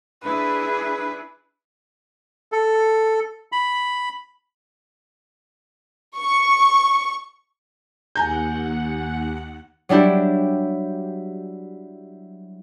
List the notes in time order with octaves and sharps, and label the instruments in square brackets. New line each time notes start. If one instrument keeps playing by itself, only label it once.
[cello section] D4 E4 G#4 [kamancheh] B4
[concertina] A4
B5
[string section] C#6
[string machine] D#2 F#5 [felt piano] G#5 A#5 G6
[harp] F#3 G3 D4 E4 G4